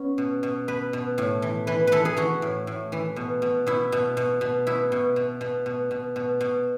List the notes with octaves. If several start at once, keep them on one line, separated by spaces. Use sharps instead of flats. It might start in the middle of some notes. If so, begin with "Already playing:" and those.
Already playing: B3 C#4
B2
B2
B2 B4
B2
A2
E3
E3 B4
E3 A4 B4
G#4
E3 F#4
A2
A2
E3
B2
B2
B2 E4
B2
B2
B2
B2 E4
B2
B2
B2
B2
B2
B2
B2